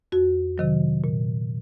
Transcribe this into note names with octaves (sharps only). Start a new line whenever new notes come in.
F2 F#4
C3 D#3 F#3
A#2